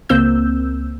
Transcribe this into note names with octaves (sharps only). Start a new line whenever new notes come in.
C#2 A#3 C4 E6 G6